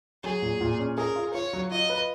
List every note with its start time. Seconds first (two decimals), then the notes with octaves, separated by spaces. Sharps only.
0.24 F#3 G#4
0.42 A#2
0.61 A#2
0.79 C#4
0.97 G#4 A#4
1.16 F4
1.34 F4 C#5
1.53 F#3
1.71 F4 D#5
1.89 B4